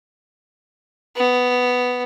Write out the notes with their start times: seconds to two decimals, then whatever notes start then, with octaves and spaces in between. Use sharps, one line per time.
1.16 B3